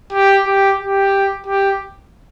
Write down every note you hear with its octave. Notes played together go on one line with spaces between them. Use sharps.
G4
G4
G4
G4